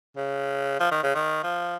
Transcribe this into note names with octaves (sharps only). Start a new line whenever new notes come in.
C#3
F3
D#3
C#3
D#3
F3